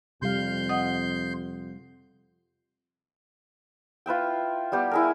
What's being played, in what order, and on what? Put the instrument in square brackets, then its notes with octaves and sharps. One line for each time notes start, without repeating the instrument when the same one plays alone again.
[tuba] F2 [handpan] C3 G3 F5 [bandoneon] C6 G6
[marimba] D#5 F#5 D#6
[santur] F4 B4 E5 G5
G3 B3 G4
E4 G#4 A#4